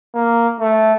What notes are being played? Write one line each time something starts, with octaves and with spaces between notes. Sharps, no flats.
A#3
A3